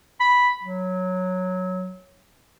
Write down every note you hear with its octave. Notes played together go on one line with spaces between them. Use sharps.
B5
F#3